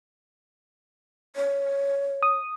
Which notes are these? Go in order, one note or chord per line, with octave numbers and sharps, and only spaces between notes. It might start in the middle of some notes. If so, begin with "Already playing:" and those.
C#5
D#6